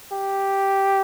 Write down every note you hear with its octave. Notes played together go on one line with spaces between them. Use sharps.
G4